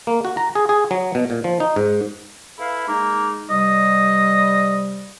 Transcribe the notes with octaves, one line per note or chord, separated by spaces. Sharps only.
A#3
F#4
A#5
G#4
G#4
F#3
B2
A#2
F3
D#4
G#2
E4 A4 B4 F5
G#3 A#3 D#4
C3 G3 D#5